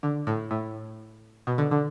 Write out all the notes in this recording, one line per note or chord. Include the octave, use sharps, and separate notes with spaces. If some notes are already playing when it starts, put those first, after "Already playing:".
D3
A2
A2
B2
D3
D3